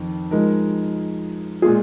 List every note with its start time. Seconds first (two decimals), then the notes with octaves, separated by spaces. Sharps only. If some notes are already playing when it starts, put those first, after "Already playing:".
Already playing: F2 D#3
0.31 F3 G#3 D#4 A#4
1.62 A#2 G#3 F4 G#4